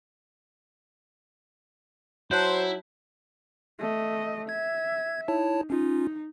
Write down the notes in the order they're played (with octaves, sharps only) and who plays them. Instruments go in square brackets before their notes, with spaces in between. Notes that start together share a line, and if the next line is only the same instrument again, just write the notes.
[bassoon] F#3 [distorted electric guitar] E4 [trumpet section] C5 [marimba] A5 F#6 G6
[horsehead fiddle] A3 D#5
[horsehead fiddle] E5 [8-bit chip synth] G#6
[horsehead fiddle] D#4 [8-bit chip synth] E4 C#5 A5
[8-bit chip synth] C#4 F4 [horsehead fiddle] D#4